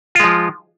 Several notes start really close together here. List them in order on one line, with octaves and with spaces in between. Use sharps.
F4 G#3 F3